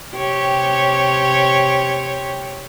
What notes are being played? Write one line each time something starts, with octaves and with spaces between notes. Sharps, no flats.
C3 G4 C#5